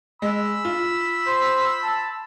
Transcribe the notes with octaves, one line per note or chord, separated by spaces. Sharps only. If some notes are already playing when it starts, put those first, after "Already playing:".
G#3 B5 E6
F4
C5
A5